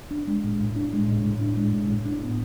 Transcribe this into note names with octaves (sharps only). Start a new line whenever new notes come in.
D4
G#3
A2
A2
D4
G#3
A2
A2
D4
G#3
A2
A2
D4
B3